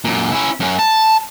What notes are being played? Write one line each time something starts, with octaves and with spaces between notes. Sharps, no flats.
F#2 A#2
C#4 E4
F#2 C#4
A5